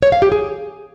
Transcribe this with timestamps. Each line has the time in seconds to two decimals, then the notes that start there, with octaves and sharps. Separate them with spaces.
0.02 C#5
0.12 F5
0.22 G4
0.32 G#4